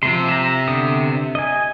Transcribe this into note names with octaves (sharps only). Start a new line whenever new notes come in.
C3 F3 A#3 C6
E5 A#5
D3 B3 D#6
D#5 G#5